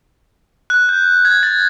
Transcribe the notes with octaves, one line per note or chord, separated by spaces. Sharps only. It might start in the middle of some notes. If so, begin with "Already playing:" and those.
F#6
G6
G#6
A6